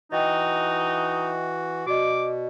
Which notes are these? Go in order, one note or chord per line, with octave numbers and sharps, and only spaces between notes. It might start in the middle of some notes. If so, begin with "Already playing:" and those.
E3 D#4 F#4 D#5 G5
B2 F#4 D5 D#5 D6